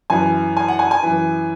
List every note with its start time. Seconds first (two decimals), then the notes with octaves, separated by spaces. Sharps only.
0.10 F#2 E3 G#5
0.57 G#5
0.68 F#5
0.79 G#5
0.91 G#5
1.03 F#2 E3